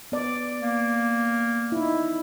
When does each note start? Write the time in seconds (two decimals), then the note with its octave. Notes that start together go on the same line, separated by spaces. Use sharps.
0.12 B3 D5
0.60 A#3
1.72 D#4 E4